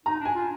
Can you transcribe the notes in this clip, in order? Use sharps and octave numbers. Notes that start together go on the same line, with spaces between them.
D#4 A#5
D4
G#5
F4